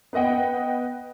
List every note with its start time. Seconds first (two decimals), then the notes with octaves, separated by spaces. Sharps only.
0.13 B3 B4 D#5 F#5 G5